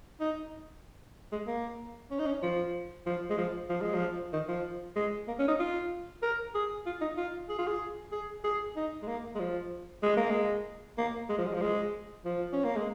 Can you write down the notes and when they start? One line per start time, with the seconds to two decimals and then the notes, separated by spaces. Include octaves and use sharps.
0.20 D#4
1.32 G#3
1.47 A#3
2.11 C#4
2.19 D#4
2.26 C#4
2.43 F3
3.06 F3
3.30 G#3
3.38 F3
3.69 F3
3.81 G#3
3.94 F3
4.33 D#3
4.48 F3
4.96 G#3
5.28 A#3
5.39 C#4
5.48 D#4
5.60 F4
6.22 A#4
6.55 G#4
6.86 F4
7.01 D#4
7.18 F4
7.49 G#4
7.58 F4
7.68 G#4
8.12 G#4
8.44 G#4
8.76 D#4
9.03 G#3
9.08 A#3
9.35 G#3
9.39 F3
10.03 G#3
10.17 A#3
10.30 G#3
10.98 A#3
11.29 G#3
11.38 F3
11.46 G#3
11.54 F3
11.61 G#3
12.25 F3
12.53 C#4
12.65 A#3
12.76 G#3